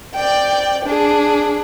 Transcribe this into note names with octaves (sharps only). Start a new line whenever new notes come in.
D5 G5
D4 G#4